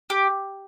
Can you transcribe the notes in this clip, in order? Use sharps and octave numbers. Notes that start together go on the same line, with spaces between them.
G4